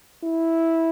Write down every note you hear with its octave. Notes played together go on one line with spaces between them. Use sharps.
E4